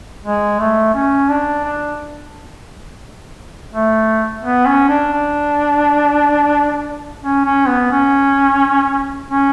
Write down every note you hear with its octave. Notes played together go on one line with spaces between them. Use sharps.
G#3
A3
C#4
D4
D4
A3
B3
C#4
D4
D4
C#4
C#4
B3
C#4
C#4